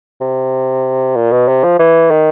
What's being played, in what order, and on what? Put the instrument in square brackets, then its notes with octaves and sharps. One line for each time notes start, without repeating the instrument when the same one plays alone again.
[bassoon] C3
A#2
B2
C3
F3
E3
D#3